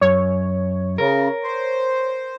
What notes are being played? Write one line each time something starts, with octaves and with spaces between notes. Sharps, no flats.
F#2 C#5
C#3 A#4
C5